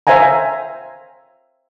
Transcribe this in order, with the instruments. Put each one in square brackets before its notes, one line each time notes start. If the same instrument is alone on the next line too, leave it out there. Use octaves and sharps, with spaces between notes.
[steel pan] C5 E5 F5 G#5 A#5